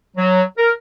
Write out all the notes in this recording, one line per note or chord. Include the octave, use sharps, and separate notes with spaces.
F#3
A#4